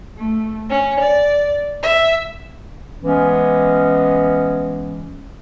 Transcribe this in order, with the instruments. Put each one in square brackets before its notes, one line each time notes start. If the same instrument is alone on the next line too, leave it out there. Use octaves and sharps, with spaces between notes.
[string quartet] A3
C#4
D5
E5
[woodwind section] E3 G#3 B3 C#4